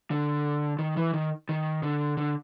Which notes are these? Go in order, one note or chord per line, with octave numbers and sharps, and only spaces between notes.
D3
D#3
E3
D#3
D#3
D3
D3